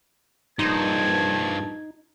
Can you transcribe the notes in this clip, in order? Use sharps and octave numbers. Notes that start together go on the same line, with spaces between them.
A#1 G2 D#4 B4 C5 A5 G#6